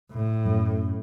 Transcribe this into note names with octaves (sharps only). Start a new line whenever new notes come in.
A2
F#2